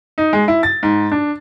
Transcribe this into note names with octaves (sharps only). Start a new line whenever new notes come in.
D#4
G#3
E4
A6
G#2
D4